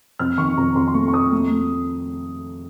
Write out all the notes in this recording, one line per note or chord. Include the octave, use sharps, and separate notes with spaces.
F2 F6
D#3 C#6
F2 A#5
F2 C6
C6
A3 C#6
C#6
F2 D#6
A3
A3